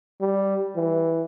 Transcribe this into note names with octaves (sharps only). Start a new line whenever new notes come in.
G3
E3